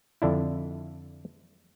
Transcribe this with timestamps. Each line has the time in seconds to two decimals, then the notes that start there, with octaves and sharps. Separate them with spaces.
0.22 F2 D3 D4 E4